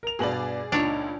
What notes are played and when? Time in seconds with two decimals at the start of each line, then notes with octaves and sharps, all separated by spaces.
0.03 A#4 F7
0.19 G2 B2 G#4 D5 F#7
0.72 C#2 A#2 D4 D#4 C#5 F7